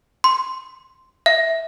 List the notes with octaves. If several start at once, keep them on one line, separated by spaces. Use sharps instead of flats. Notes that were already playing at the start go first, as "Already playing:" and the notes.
C6
E5